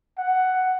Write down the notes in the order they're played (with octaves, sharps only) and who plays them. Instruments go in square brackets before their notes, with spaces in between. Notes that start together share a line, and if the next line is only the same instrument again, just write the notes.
[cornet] F#5